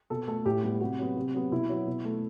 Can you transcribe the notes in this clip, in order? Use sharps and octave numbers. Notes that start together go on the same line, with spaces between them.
B2 A4
A3 A4
A2 G4
G3 B3
C3 F#4
F#3 B3
C3
F#3 B3
B2 E4
F#3 B3
B2
A3